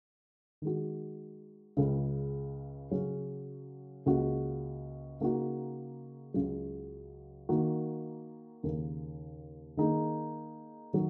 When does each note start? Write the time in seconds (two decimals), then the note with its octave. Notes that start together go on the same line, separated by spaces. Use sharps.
0.62 D#3 G#3 F#4
1.77 C#2 C#3 G#3
2.91 C#3 F#3 C#4 G#4
4.06 C#2 C#3 A#3 F#4
5.20 C#3 A#3 D#4 F#4
6.34 C#2 C#3 F#3
7.49 D#3 A#3 F#4
8.63 D#2 C#3 A#3
9.77 D#3 A#3 D#4 G#4
10.93 D#3 F#3